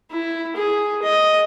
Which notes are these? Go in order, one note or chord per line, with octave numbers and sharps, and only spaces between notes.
E4
G#4
D#5